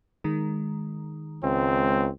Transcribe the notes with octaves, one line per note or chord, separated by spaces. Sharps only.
D#3 G#3
C#2 C4